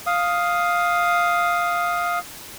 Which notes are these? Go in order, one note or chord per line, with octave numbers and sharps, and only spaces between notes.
F5 D#6